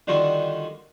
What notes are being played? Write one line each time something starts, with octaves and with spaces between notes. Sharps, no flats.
D3 D#3 G3 F4 F#4 A4